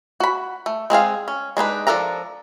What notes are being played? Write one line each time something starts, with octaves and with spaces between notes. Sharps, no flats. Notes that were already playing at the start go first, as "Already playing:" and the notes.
F#4 B5
A3
G#3 C4 G#4 F5
C#4
G#3 D4 D#4 B4
F3 D4 A4 A#4 A#5